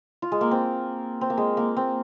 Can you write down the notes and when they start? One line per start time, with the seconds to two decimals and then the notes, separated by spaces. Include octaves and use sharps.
0.22 F4
0.32 G#3
0.41 A#3
0.51 C4
1.21 C4
1.30 A#3
1.37 G#3
1.57 A#3
1.77 C4